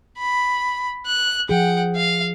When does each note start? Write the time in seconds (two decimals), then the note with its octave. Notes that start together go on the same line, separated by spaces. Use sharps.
0.18 B5
1.06 F#6
1.49 F3 G#4 F#5 G5
1.96 F5